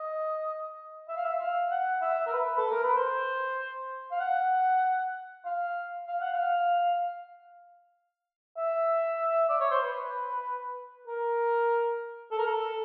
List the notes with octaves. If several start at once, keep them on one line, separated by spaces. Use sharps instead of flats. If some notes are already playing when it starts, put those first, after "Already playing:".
Already playing: D#5
E5
F5
E5
F5
F#5
E5
A#4
B4
A4
A#4
B4
C5
F5
F#5
F5
F5
F#5
F5
E5
D5
C#5
C5
B4
A#4
A4
A#4
A4